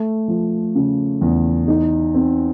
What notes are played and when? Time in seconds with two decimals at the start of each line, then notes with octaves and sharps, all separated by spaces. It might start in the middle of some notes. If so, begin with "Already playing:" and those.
Already playing: A3
0.28 F3
0.75 C#3
1.21 E2
1.68 D#4
2.14 C4